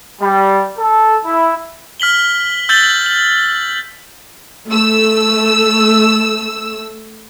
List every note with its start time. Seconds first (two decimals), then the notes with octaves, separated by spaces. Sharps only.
0.21 G3
0.77 A4
1.24 E4
2.00 F6 B6 F#7 G7
2.69 E6 G6 A6 B6 F#7 G7
3.06 F#7
4.68 A3 E6